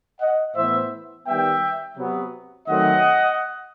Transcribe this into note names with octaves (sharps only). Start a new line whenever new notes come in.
D#5 F#5
A2 E3 B3 C5 E5
D#3 G3 B3 E5 G5
C3 F#3 B3
D#3 F#3 A3 C4 D#5 F#5